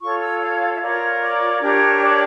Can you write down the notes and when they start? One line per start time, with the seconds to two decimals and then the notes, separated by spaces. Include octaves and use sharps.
0.01 F4 A4 C#5 C#6
0.21 E6
0.41 F5
0.75 E5
0.81 F4 A#4 C#5 D5
1.21 D5
1.61 D4 G4 A#4 C#5
2.01 D5